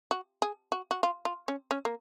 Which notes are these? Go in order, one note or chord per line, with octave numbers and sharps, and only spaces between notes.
F#4
G#4
F#4
F#4
F4
F4
C#4
C#4
A#3